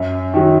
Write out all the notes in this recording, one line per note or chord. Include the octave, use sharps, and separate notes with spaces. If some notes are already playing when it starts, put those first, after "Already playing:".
Already playing: F#2
D#3 F#3